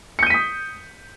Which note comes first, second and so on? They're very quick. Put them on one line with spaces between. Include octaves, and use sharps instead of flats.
C#7 G6 D#7 B6 D#6